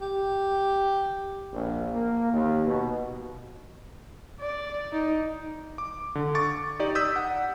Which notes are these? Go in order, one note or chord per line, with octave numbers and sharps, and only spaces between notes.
G4
A#1
A#3
D#2
B2
D5
D#4
D6
D3
C#6 D6 A6
D#4 G4 D5
D#6 E6 G6 B6
F#5